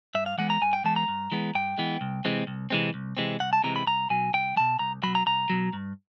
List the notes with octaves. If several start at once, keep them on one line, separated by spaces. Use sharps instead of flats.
G2 E5
F5
E3 G#3 B3 F#5
A#5
G2 G#5
G5
E3 G#3 B3 A5
A#5
G2
E3 G#3 B3
G2 G5
E3 G#3 B3
C2
C3 E3 G#3 C4
C2
C3 E3 G#3 C4
C2
C3 E3 G#3 C4
C2 F#5
A5
C3 E3 G#3 C4 A#5
B5
C2 A#5
B2 F#3 G#5
C2 G5
B2 F#3 A5
C2 A#5
B2 F#3 B5
A#5
C2 A#5
B2 F#3
G2